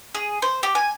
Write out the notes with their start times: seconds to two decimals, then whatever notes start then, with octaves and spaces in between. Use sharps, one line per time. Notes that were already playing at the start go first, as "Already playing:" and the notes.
0.15 G#4
0.42 C5
0.63 G4
0.75 G#5